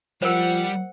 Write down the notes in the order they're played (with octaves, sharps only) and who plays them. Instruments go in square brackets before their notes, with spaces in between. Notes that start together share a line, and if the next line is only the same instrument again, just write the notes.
[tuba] F3 [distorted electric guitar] G3 [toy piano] A#4 C5 [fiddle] F#5